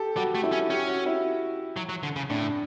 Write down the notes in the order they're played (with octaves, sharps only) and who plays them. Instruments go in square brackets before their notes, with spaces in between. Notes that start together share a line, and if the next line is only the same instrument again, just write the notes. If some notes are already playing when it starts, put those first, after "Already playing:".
Already playing: [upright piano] G4 A4
[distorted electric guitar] G3 [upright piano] F#4
[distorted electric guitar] A3
[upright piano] E4
[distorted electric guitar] C#4
[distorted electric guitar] C#4 [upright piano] G4
[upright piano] F#4
E4
[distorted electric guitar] F#3
F#3
D3
C#3
[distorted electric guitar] A2 [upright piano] D4